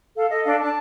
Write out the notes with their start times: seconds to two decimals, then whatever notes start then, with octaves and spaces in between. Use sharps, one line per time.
0.15 A4 F5
0.29 A4 D#5
0.45 D4 F5
0.59 D4 A5